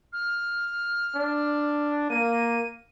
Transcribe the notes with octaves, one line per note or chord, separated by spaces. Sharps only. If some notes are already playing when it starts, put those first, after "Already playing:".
F6
D4
A#3 D#7